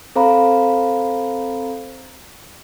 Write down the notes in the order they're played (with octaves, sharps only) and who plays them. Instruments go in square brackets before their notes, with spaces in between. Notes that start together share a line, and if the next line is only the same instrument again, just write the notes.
[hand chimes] C4 A4 C5 F5 A#5 B5